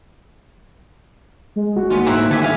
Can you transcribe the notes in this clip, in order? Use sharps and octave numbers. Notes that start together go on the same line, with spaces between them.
G#3
G1 F#4
D#2 B3 C#4 F4
A2 A#3 C4 E4 F#6
D3 E3 G4 A4 G#6
D#1 D3 E4 D#5 F5 G#5